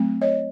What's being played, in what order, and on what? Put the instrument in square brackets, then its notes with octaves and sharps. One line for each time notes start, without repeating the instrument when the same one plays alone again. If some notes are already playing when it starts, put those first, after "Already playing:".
Already playing: [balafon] F#3 A3 C4
C#5 D#5